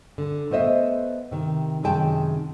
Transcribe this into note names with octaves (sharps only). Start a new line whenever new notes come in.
D3
A3 B3 C5 D#5 E5
C3 D#3
F#2 C3 D#3 G#3 G5 A5